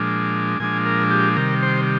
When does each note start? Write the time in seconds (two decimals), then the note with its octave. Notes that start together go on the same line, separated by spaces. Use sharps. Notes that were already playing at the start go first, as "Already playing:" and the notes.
Already playing: A#2 F3 G#3 D4
0.60 A#2 F3 G#3 D4 G#5
0.86 A#4
1.11 G4
1.36 C3 D#3 G3 A#4
1.63 C5